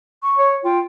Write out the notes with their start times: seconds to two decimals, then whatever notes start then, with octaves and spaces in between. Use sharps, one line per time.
0.23 C#6
0.38 C#5
0.65 F4 G5